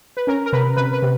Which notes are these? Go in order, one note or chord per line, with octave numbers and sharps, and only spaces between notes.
B4
C#4 A#4
A#4
C3 B4
C3 B4
B4
C3